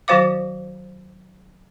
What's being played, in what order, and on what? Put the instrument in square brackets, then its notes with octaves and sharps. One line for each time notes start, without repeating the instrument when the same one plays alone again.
[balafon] D#3 F#3 F#4 C5 F5 D6